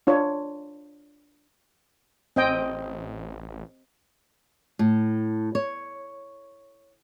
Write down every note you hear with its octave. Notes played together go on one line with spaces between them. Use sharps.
D4 F4 C#5
A1 C4 D#5 G5
A2
C#5